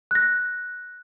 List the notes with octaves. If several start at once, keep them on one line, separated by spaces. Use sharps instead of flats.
F#6 A#6